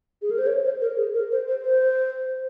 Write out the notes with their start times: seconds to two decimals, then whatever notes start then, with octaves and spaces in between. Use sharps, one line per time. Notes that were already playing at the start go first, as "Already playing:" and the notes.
0.22 G#4
0.31 A#4
0.38 C5
0.47 C#5
0.64 C5
0.81 A#4
0.97 G#4
1.14 A#4
1.32 C5
1.48 C5
1.65 C5